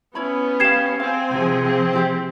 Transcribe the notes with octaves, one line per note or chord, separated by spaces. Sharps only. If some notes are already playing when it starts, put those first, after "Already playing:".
B3 C#4 E4 C#5 B5
G4 F5 G#6 C7 E7
C4 C5 F5 G#5
C3 F3 G#4
C4
E4 G4 C5